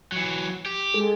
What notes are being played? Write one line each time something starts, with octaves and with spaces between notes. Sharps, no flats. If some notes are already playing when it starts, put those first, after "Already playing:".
E3 F#3
G4
G#3 G#4 A4